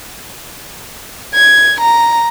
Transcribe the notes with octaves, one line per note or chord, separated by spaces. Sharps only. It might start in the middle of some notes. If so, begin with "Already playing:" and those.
G#6
A#5